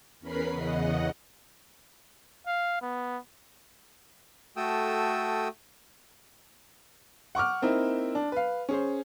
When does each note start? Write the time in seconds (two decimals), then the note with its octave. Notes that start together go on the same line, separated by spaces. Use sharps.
0.20 E2 C#4 A#4 B4 B5 C7
0.51 E2 C#3 D#5 F#5
2.47 F5
2.82 B3
4.57 A3 F#4 A4 G5 D#6 E6
7.35 F#5 C#6 D6 F6
7.62 A#3 C4 D#4 E4
8.15 D4
8.32 B4 F5
8.69 C#4 G#4 C5